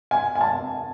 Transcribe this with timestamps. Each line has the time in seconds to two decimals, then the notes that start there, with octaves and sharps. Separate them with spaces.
0.11 G#5
0.35 G#5
0.41 A5